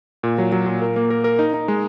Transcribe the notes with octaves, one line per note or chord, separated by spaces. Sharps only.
A#2
F#3
F#3
A#2
A#4
A#3
A#4
A#4
D#4
D#4
G#3